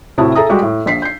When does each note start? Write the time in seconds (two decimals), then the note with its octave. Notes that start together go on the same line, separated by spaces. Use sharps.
0.18 A2 C3 E4 F#4 A5 D#6
0.35 G#4 A4 E5 A#5 D#6
0.49 G3 G#3 F#4 G4
0.62 A2
0.86 A#1 B6 C7
1.02 G6 C7